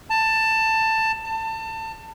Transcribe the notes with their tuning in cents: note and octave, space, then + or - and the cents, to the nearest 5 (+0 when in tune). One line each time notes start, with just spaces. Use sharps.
A5 +15
A5 +25